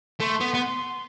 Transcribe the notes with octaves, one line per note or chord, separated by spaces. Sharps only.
A3 C6
B3
B3
C6